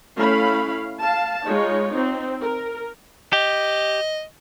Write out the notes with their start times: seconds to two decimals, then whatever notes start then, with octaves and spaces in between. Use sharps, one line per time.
0.18 A3 C#4 E4 F5 B5
0.99 F5 A5
1.45 G#3 D#4 F4 C#5
1.91 C4 D#4
2.40 A#4
3.33 G4 D#5